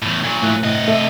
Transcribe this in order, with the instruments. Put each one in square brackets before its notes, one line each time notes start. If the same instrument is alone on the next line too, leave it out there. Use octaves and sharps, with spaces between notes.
[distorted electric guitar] E2 A2
A#2 F#3
[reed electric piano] A2 A3 F#6
[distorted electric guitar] C3 D#5
[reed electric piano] A3 E5